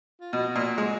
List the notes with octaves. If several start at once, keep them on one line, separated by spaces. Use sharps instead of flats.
F4
B2 F#4
A#2
G#3